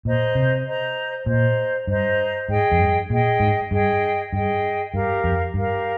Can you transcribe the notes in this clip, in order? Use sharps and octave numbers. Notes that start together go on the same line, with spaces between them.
A#2 C5 D#5 A#5
C3
C5 D#5 A#5
A#2 C5 D#5 A#5
G2 C5 D#5 A#5
G#2 G#4 D#5 G5
F2
G2
A#2 G#4 D#5 G5
G#2
G2 G#4 D#5 G5
G2 G#4 D#5 G5
G2 G4 A#4 F5
F2
G2 G4 A#4 F5